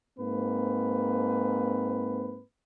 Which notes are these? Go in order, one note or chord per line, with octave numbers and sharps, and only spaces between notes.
G#2 A#3 C4 B4